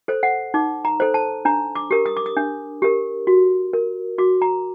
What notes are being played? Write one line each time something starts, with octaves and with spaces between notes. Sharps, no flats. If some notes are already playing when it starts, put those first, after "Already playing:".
A4 C5
F#5
D#4 D6
A#5
A4 C5
A5
D4 A#5
D6
G4 A#4
D#6
D6
D#6
D4
G4 A#4
F#4
A#4
F#4 D6
A#5